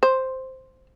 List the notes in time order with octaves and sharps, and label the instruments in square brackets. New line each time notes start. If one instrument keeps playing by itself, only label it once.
[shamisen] C5